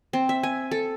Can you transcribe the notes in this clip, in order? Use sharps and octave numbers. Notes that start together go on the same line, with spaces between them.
C4
E5
G#5
A4